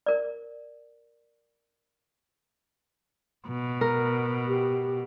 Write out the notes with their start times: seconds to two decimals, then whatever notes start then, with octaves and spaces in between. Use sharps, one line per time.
0.06 A#4 D5
3.48 B2
3.81 A#4
4.47 G4